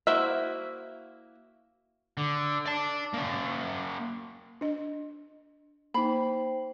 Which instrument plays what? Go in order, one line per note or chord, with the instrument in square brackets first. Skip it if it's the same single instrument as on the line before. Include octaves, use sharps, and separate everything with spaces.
[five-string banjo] A#3 E4 F#4 C5 E5
[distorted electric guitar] D3
D5 A5
A#3 C#4
[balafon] D4 D#5
[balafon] A#3 D#4 [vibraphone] C5 G5 [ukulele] B5